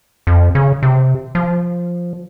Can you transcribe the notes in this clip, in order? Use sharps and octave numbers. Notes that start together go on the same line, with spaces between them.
F2
C#3
C3
F3